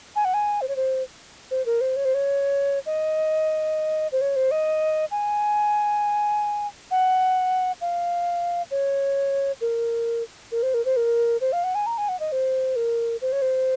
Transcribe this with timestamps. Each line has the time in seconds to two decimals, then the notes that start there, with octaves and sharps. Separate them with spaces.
0.16 G#5
0.25 F#5
0.34 G#5
0.61 C5
0.68 C#5
0.76 C5
1.51 C5
1.66 A#4
1.81 C5
1.96 C#5
2.05 C5
2.14 C#5
2.86 D#5
4.12 C5
4.21 C#5
4.36 C5
4.51 D#5
5.11 G#5
6.91 F#5
7.81 F5
8.71 C#5
9.61 A#4
10.52 A#4
10.63 C5
10.74 A#4
10.85 C5
10.96 A#4
11.41 C5
11.52 F5
11.64 F#5
11.75 G#5
11.86 A#5
11.98 G#5
12.09 F#5
12.20 D#5
12.32 C5
12.76 A#4
13.21 C5
13.32 C#5
13.42 C5